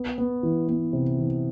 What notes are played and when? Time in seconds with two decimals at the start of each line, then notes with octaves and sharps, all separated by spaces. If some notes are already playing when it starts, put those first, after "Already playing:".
Already playing: B3
0.18 B3
0.43 E3
0.68 B3
0.93 C3
1.18 E3